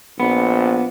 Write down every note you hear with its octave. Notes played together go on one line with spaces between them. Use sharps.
A#1 B3